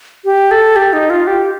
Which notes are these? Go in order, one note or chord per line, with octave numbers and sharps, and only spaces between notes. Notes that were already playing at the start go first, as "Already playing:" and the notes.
G4
A4
G4
D#4
F4
G4